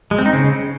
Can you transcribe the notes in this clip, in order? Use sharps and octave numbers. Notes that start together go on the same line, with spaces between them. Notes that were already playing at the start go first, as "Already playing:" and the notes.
G#3
C4
D#4
C#3